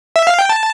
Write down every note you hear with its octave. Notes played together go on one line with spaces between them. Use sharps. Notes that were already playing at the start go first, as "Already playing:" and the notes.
E5
F5
G5
A5